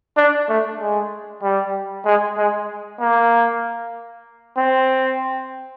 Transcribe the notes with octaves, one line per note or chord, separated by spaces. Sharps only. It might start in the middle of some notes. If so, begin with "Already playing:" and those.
D4
A3
G#3
G3
G#3
G#3
A#3
C4